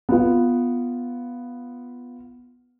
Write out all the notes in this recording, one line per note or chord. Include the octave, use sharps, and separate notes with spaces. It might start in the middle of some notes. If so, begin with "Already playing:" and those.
B3 F4